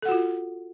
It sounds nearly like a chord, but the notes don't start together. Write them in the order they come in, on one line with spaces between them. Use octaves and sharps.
A4 F#5 F#4 F4